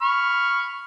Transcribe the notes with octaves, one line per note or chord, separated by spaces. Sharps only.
B5 C#6 F6